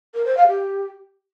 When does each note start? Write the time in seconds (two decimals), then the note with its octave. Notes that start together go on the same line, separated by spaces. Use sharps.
0.14 A#4
0.25 C5
0.37 F5
0.48 G4